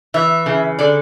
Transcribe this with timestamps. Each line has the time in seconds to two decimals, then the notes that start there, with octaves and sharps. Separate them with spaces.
0.14 E3 E5
0.46 C#3
0.79 D3 D5